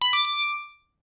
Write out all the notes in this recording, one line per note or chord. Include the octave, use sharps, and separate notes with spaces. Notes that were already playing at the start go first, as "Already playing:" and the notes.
B5
D6
D6